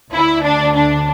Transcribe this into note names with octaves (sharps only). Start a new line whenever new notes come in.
D2 D3 E4
D4
D4